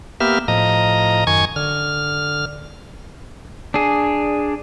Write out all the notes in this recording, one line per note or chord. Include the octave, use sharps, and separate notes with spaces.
A#3 B3 G4 E5 F6
A2 F3 D#5 A#5
F#2 D#3 G#5 C#6 G#6
D3 F6
D4 G#4